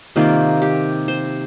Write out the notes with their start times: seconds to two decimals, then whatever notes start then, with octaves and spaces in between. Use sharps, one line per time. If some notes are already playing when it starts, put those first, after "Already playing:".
0.16 C3 D#3 A#3 F4
0.62 G4
1.08 C5